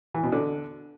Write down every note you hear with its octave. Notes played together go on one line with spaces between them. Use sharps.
E3
B2
D3